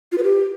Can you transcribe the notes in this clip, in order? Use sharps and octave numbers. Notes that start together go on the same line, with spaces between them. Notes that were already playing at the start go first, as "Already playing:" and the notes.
F4
B4
G4